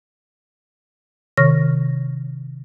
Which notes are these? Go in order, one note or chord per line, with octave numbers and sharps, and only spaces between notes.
C3 D#3 C#5 C#6 F6 A#6